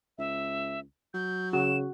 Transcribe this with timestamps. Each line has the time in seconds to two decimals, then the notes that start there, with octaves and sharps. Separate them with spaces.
0.18 C#2 E5
1.14 F#3 G6
1.53 C#3 F#4 E7